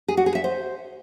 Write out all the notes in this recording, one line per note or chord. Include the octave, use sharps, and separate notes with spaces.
G#4
F#4
G#4
E5
C5